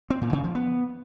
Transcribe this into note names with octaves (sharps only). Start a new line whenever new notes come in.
C4
A#2
C#3
F3
B3